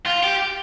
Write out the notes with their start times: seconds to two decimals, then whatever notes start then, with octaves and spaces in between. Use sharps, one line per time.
0.06 F4
0.23 G4